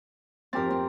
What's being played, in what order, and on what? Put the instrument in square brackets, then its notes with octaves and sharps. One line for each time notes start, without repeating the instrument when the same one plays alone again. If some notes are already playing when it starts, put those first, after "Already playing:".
[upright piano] F2 G4 A6 [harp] C4 A#4
[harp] C4